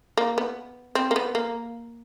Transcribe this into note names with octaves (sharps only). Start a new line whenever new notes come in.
A#3
B3
C4
A#3
B3
A#3